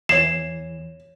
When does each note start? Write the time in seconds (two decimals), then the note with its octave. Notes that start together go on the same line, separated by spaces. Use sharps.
0.09 E2 E3 C#5 C7 E7